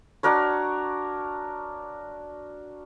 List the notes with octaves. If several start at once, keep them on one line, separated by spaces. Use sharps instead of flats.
D4 F#4 A#4 C#5